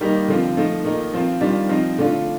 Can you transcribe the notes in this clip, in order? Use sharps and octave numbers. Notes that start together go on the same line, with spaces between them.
D#3 G3 A#3 D#4
D3 F3 C4 F4
F3 A3 D#4
D#3 A#3 D#4
F3 C4 F4
D#3 G3 D4 F4
F3 C4 D#4
D3 A3 D4 F4